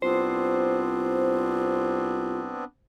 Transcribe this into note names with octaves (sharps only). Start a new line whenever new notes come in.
C2 B3 C4 D4 F4 C5